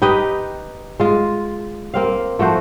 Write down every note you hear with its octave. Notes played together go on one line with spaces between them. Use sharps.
D#4 G4 B4 D#5
G#3 F4
A#3 C4 F5
F3 A3 F#4 C5